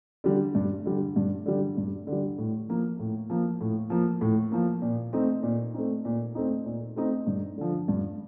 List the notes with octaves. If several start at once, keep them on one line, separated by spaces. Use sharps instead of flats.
D3 G3
G2
D3 G3
G2
D3 G3
G2
D3
G3
A2
F3 A#3
A2
F3 A#3
A2
F3 A#3
A2
F3 A#3
A#2
A3 C4 D#4
A#2
A3 C4 D#4
A#2
A3 C4 D#4
A#2
A3 C4 D#4
G2
D3 F3
G2